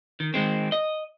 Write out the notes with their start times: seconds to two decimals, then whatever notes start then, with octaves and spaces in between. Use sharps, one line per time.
0.20 D#3
0.34 D#3 G#3 C4
0.72 D#5